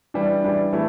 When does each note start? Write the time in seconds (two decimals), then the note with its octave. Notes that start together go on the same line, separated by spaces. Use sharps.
0.14 E3 G3 D4
0.44 E3 G3 D4
0.73 E3 A3